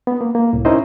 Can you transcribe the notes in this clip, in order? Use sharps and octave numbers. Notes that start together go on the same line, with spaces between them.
B3
A#3
A#3
C2 A2
C#4 D#4 E4 A#4 C5 D#5